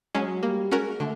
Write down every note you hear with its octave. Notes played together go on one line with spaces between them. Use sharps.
F#3 G#3 C#4
G3 A#3
G#3 C#4 F#4 A#4
D3 A3